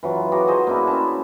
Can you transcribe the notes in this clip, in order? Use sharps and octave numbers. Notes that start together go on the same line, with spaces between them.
E3 F#3 F4
F#4 G#4 A#5 D6
F#4 G#4 C5 D#5
A#3 D4 E4 G#4
C#4 E4 A5